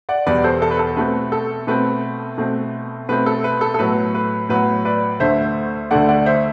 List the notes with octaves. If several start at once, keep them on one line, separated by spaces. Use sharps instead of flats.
D5 F#5
E2 B2 G3 B3 B4 D5
A4 C5
A4
B4
A4
B2 A3 C4 B4
A4
B2 A3 C4 B4
B2 A3 C4
B2 A3 C4 B4
A4
B4
A4
A4
A2 F#3 B3 B4
B4
A2 F#3 B3 B4
B4 D5
D2 D3 A3 C5 E5
D2 D3 A3 D5 F#5
D5 F#5
C5 E5